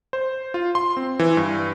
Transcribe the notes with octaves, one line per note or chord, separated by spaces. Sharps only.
C5
F4
C6
C4
E3
G2